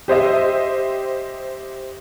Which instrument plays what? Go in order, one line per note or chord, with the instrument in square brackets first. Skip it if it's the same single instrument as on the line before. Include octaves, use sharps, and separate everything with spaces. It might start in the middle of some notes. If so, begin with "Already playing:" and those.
[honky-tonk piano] G4 C5 D#5 E5